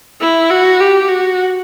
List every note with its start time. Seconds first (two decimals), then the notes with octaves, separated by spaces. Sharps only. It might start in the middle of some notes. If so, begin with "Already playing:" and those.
0.21 E4
0.50 F#4
0.80 G4
1.08 F#4